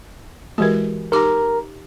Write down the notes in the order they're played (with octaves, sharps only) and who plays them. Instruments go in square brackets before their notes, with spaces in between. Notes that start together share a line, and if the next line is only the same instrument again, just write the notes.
[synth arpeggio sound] E3 G#3 [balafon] F#4 G4 A#4
[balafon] D#4 G4 D6 [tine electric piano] A#4 A#5